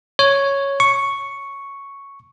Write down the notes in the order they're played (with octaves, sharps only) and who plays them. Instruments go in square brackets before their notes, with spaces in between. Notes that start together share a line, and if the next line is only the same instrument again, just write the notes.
[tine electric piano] C#5
C#6